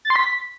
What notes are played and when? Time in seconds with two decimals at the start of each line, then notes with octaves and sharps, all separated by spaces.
0.05 A6
0.10 C6
0.16 B6